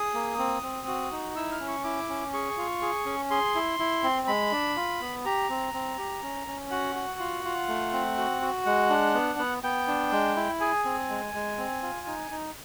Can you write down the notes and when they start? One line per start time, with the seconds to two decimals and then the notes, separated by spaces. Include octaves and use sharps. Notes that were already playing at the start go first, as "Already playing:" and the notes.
Already playing: G#4 D#6
0.15 A#3
0.38 C4
0.63 C4
0.88 F#4
1.12 D#4
1.36 E4 E6
1.52 F6
1.60 C#4
1.68 C#6
1.84 E4 D6
2.09 C#4
2.33 G#4 C#6
2.58 F4
2.82 G#4
3.06 C#4
3.30 G#4 C6
3.55 E4
3.79 E4
4.03 C4
4.28 G#3 B5
4.52 D4
4.77 F4
5.01 B3
5.25 G4 A#5
5.50 C4
5.74 C4
5.98 G4
6.23 C#4
6.47 C#4
6.71 F#4 F#5
6.96 F#4
7.20 F4
7.45 F4
7.69 A3
7.93 C4
8.18 F#4
8.42 F#4
8.66 G#3 F#5
8.90 D4
9.14 B3
9.39 B3
9.63 B3 G5
9.88 D4
10.12 G#3
10.36 E4
10.61 G#4 G#5
10.85 C4
11.09 G#3
11.34 G#3
11.58 C4
11.82 F4
12.07 D#4
12.31 D#4